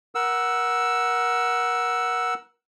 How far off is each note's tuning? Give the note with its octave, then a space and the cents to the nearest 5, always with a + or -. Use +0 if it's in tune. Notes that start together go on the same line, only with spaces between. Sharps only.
A#4 +25 F#5 +0 E6 +0